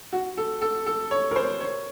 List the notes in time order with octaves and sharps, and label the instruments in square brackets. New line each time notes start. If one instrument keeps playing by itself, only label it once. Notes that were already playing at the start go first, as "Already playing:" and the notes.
[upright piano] F#4
A4
A4
A4
C#5
A#4
C5
C#5